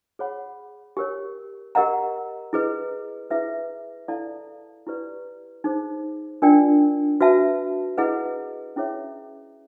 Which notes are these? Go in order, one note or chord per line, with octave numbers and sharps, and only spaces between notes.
G#4 C#5 F#5 B5
G4 A#4 C#5
G4 A#4 D#5 F#5 A#5
E4 G#4 B4 D#5
E4 G#4 B4 E5
E4 A4 D5 F5 A5
E4 G4 B4 D5
D#4 G#4 C5
D4 F4 A#4 D5 G5
F#4 B4 E5 A5
E4 G#4 B4 D#5 F#5
C#4 E4 G#4 C#5 E5